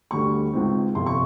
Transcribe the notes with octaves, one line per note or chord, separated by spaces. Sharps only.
D2 D3 G3 C#6
C#2 B2 G#3 C4 D#4
G1 F2 C3 F3 C6
C#6